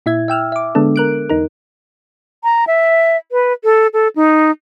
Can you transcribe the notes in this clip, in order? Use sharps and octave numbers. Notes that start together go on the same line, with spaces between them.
A#2 E4 E5 G#6
E5 G5 E6 F6
E5 D6
D3 G#3 B3 D4 A4
A#4 F#6 D7
E2 D#4 A#4
A#5
E5
B4
A4
A4
D#4